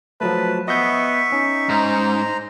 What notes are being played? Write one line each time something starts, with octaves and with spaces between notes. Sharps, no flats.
F3 F#3 A3 B4 A5
B3 D#5 E5 C#6 G6
C#4 D#4
G#2 C5 A#5